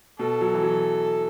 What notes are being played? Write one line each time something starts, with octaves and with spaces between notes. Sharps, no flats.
B2 A4
F#3
E3
F#3